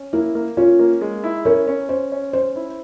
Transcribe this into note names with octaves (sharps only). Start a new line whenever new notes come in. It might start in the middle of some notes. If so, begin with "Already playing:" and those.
Already playing: C#4
A#3 E4
A#3
C#4 F4
A#3
G#3
E4
C#4 A#4
C#4
C#4 C5
C#4
C#4 C5
E4